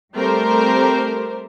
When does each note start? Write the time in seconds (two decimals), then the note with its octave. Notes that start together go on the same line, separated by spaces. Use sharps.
0.15 G3 A3 C4 G4 A#4 C5